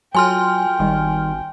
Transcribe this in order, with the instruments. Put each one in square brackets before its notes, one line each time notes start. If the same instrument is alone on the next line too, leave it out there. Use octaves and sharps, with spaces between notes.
[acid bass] F#3 [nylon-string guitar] F4 F#4 A4 [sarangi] G5 [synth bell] G#5 C6 F6
[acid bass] G#1 [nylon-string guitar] D#3 G3